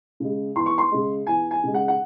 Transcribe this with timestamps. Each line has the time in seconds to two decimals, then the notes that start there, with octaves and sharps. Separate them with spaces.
0.20 C#3 G#3
0.56 E2 C6
0.66 C#6
0.78 C6
0.91 C#3 G#3
1.27 E2 G#5
1.51 G#5
1.63 C#3 G#3
1.74 F#5
1.88 F#5